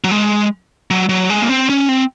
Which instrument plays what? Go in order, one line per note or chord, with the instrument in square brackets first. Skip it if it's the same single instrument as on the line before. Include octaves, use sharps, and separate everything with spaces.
[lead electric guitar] F#3
G#3
F#3
F#3
G#3
A#3
C4
C#4
C4